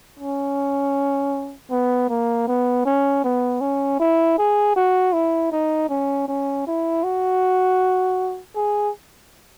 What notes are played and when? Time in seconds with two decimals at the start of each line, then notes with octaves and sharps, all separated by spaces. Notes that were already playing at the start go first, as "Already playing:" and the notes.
0.19 C#4
1.71 B3
2.09 A#3
2.48 B3
2.85 C#4
3.24 B3
3.61 C#4
4.00 E4
4.38 G#4
4.76 F#4
5.13 E4
5.52 D#4
5.89 C#4
6.28 C#4
6.67 E4
7.04 F#4
8.56 G#4